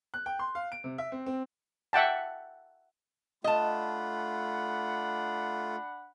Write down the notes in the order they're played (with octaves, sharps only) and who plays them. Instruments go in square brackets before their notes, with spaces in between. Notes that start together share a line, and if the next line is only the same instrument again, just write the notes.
[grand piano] F#6
G5
C6
F5
D7
C3
E5
C4
C4
[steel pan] E5 F#5 G5 A5
[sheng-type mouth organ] A3 F4 [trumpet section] D4 F#5 B5 [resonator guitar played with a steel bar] D#5 A5